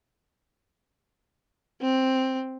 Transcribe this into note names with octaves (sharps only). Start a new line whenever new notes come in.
C4